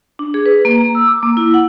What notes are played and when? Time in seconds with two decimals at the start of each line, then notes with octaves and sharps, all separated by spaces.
0.19 D4
0.34 G#4
0.46 B4
0.65 A#3
0.78 A#5
0.95 E6
1.07 D6
1.23 A#3
1.37 E4
1.54 F#5